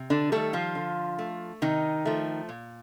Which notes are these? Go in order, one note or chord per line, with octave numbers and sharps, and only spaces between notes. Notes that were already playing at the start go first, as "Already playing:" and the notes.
Already playing: C3
D3 D4
D#3 G3 A3 A4
F3 F4
D3
A3
C3 D#3 D#4
F3 A3
A#2